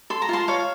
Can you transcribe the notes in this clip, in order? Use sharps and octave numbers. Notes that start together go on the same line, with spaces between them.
A4 C6
A#5
F4 A5 C6
C#5 F5